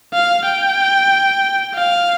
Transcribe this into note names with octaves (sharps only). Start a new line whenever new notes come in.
F5
G5
F5